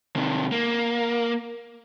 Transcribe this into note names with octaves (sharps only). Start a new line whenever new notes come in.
C3 D#3
A#3